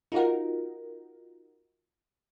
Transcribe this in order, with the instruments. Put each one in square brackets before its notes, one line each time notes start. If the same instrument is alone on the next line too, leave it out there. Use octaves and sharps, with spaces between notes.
[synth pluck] D#4 F4 F#4 A#4